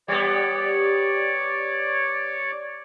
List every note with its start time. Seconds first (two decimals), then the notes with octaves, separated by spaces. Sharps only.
0.08 G3 B3 C#5 D5